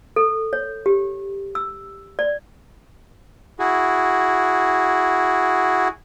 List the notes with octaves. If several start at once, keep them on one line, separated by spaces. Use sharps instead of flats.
A4
C#5
G4
E6
D5
E4 F#4 G#4